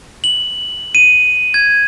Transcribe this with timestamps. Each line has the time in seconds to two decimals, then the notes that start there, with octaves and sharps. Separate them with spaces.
0.24 F#7
0.95 D#7
1.54 G#6